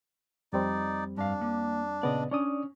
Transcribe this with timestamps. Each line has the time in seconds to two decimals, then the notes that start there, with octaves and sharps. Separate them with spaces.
0.53 F2 G3 C4 D#4 D5
1.17 G2 D4 F5
1.41 A#3
2.03 A#2 C#3 B3 D5 D#5
2.31 C#4 D4 D5 D#6